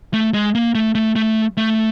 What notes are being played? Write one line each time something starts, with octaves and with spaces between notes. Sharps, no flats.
A3
G#3
A#3
A3
A3
A3
A3